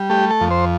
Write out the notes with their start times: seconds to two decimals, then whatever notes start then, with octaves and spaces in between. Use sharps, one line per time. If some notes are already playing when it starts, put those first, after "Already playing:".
Already playing: G3
0.10 A3 G4
0.30 A4
0.41 F2
0.51 C5